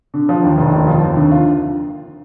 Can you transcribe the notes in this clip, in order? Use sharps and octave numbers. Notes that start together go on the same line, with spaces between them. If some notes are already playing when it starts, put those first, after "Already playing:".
D3
F3
D#2
F1
D#2
F3
D#2
D3
F4